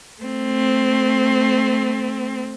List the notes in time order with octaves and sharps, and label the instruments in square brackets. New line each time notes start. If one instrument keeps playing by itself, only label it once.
[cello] A3 C4